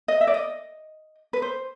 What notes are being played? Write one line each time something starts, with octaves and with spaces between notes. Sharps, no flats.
D#5
E5
D5
D#5
B4
C5